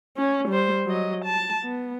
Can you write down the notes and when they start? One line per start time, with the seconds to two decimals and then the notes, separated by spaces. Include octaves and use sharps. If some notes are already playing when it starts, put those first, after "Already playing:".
0.17 C#4
0.49 G3 C5
0.86 F#3 D#5
1.25 A5
1.64 B3